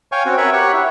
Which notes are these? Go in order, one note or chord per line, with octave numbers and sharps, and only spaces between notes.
C#5 F5 G5 G#5 C#6
C4 C#4 F#4
A#4 B4 C#5 E5 B5 C#6
G4 C#5 F#5 C#6
E4